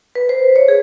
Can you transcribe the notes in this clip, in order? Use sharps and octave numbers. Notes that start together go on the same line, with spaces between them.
B4
C5
C#5
G#4